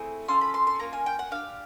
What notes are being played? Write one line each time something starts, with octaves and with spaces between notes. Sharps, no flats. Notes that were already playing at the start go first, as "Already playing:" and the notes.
Already playing: A3 C4 E4 G#4
C#4 F4 A4 C6
B5
C6
C6
A#3 C#4 F4 A#5
G#5
G5
F#5
D4 G4 F5